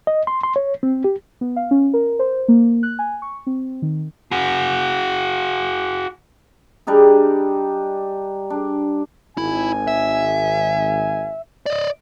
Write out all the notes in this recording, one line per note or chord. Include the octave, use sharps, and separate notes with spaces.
D#5
C6
C6
C#5
C4
G4
B3
F5
C#4
A#4
C5
A#3
F#6
G#5
C#6
C4
D#3
F#4 G#4
G3 D4 D#4 G#4
D4
G#1 E4 G#5
E5
D5 D#5